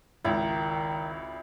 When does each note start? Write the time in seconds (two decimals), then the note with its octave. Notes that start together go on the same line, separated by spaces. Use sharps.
0.25 G#1 C#2 D#3 E4